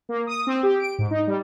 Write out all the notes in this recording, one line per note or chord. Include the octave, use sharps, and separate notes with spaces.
A#3
D#6
C4
G4
D7
G#2
D#4
G3